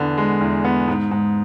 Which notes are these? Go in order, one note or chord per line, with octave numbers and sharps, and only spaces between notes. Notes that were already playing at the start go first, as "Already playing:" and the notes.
Already playing: E2 D3 B3
G#3
E2
B3
G#2
G#2